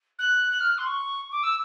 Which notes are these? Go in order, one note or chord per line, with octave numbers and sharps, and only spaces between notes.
F#6
F#6
F6
F#6
C6
C#6
D6
E6